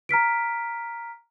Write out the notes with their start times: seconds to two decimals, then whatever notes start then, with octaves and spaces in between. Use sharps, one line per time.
0.09 A#5 F6 B6 D7